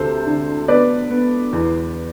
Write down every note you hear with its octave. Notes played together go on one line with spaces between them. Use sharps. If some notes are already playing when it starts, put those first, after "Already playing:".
Already playing: D2 C3 A4 C5
D3
B3 B4 D5
B3
E2